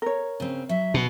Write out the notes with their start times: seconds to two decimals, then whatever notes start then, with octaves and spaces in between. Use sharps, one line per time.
0.02 A#4 C#5
0.40 C#3 C4
0.69 F#3 E5
0.94 B2